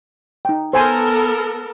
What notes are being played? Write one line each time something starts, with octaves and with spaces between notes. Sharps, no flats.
D#4 G5
B3 A4 A#4 C5 G#5 C6